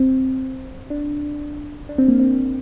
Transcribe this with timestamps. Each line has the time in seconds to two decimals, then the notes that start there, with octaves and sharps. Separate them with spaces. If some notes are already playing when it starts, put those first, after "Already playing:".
Already playing: C4
0.90 D4
1.89 D4
1.98 C4
2.08 A#3
2.20 C4